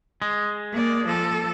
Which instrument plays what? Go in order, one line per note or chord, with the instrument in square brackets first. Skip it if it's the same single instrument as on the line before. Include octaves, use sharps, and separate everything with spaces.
[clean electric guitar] G#3
[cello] A#3 D5
F3 A4